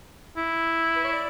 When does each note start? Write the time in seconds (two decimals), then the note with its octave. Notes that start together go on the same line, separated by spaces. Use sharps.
0.37 E4
0.96 B4
1.04 C#5
1.13 D5